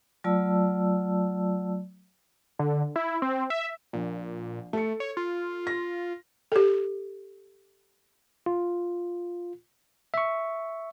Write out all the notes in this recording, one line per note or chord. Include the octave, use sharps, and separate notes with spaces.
F#3 A3 F4 D5 A5 E6
D3
E4
C4
E5
A#1 A#2
A3 A4 C#7
C#5
F4
A#6
G4 A4
F4
E5 C#6